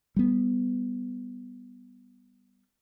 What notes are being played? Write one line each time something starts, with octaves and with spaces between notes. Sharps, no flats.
G3 B3